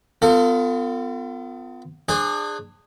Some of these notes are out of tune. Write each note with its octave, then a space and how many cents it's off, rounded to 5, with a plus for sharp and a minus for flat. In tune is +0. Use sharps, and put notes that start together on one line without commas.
B3 +35 F4 +0 A4 +40
D4 +25 G#4 -10 C5 +40